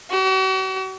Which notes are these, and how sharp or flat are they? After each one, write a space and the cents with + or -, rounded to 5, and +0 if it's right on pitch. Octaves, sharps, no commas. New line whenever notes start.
F#4 +40